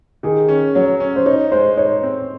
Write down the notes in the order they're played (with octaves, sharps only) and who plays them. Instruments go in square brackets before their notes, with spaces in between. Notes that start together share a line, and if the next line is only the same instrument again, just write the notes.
[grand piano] D#3 [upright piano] G#4
[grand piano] C#4
[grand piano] F#3 [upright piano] C#5
[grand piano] C#4
[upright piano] C5
[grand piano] D#4 [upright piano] C#5
[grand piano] G#3 [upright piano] C5
[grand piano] D#4 [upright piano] C#5
[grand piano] C4